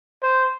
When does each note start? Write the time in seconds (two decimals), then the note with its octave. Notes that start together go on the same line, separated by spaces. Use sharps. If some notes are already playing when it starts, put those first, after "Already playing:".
0.23 C5